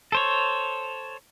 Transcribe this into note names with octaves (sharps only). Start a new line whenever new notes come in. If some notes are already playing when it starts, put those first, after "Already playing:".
A4 C5 C#5